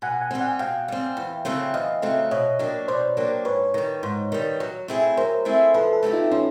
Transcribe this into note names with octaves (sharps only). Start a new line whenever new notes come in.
B2 F#5 G#5
F#5 G#5
G3 C4
F#5 G#5
B2 F5 G5
G3 C4
E2
C#3 F#3 A3 C4
E2 D#5 F5
C#3 F#3 A3 C4
B2 C#5 D#5
F#3 A#3 D4 G4
B2 C5 D5
F#3 A#3 D4 G4
G#2 B4 C#5
D#3 G3
G#2
D#3 G3
F#3
A3 C4 E4 G#4
F#3 A#4 C5
A3 C4 E4 G#4
F3 A4 B4
A4 B4
A3 C4 E4 G4
D#4 F4
F3 C#4 D#4